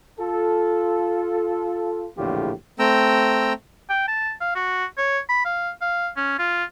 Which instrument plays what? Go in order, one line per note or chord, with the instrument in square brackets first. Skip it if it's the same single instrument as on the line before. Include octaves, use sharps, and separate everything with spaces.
[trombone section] F4 A4
A#1 E2 A2 D3 F4 G4
[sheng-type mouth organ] A3 C4 G5 A#5 E6
[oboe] G5
A5
F5
F#4
C#5
B5
F5
F5
C#4
F4